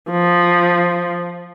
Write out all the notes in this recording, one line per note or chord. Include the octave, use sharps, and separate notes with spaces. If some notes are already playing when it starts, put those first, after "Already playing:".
F3